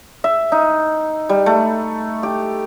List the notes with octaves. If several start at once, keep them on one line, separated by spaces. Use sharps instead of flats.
E5
D#4
G3
A3
G4